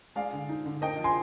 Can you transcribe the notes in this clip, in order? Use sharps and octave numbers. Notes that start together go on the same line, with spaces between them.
G#3 D5 F5
D3
D#4
D3
A#3 D#5 G5
F3
G#5 C6